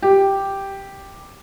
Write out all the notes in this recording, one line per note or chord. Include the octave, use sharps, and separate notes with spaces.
G4